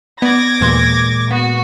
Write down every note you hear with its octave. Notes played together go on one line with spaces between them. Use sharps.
B3 D5 D6 G#6 A#6
D#2 A#2 E3 G#3 C6
B3 F#4